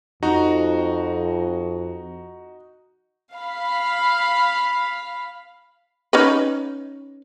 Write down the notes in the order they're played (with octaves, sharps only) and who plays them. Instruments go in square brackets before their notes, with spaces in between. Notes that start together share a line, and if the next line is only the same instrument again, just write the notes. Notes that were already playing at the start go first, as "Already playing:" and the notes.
[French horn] F2 [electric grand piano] D#4 F#4 A#5
[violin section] F5 B5
[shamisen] C#4 D#4 B4